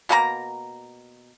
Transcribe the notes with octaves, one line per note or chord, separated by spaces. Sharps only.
B2 A#3 C4 A#5